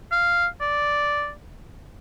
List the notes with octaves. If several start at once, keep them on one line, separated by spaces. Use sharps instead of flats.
F5
D5